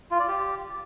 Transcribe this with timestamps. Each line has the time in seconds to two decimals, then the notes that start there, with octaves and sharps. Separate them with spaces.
0.11 F4
0.20 D5
0.28 G4